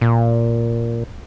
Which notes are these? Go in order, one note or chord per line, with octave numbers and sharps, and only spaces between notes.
A#2